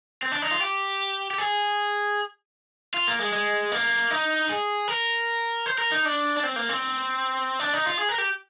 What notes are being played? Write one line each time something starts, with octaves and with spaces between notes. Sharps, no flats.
C4
D4
D#4
F4
G4
G4
G#4
F4
A#3
G#3
G#3
A#3
D#4
G#4
A#4
C5
A#4
D#4
D4
D4
C4
A#3
C4
D4
D#4
F4
G#4
A#4
G4